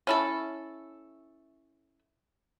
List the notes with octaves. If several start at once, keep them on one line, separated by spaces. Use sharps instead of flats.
C#4 E4 A4